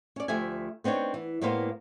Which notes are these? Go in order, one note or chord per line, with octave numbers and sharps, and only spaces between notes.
C#4 D5
D2 F3 A3 G4 E5 G#5
B3 C4 D4 D#4 C#5
E3
A2 G3 A#3 B3 C5 F5